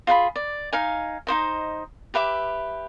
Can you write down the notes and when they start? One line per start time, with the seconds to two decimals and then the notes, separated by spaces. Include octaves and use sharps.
0.07 F4 G#4 F#5 B5
0.36 D5
0.73 D#4 F5 G#5
1.27 D#4 F4 C5 D#5
2.14 G4 B4 E5 D6